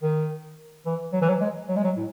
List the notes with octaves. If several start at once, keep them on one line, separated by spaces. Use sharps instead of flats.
D#3
E3
F#3
E3
F#3
G#3
F#3
G#3
F#3
A2